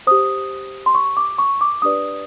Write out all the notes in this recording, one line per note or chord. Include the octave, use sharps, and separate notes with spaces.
G4 C5 D#6
C6
C#6
D6
C#6
D6
D4 G4 B4 D5 D#6